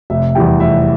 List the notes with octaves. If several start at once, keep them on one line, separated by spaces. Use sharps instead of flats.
F1 E5
E2 E3 G3 G5
F1 E5